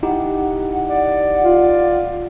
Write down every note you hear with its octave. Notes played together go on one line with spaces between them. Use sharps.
D#4 E4 G4 F#5
D5
F4